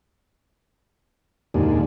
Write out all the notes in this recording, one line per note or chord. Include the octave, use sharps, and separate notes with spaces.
D#2 A#2 D3 G#3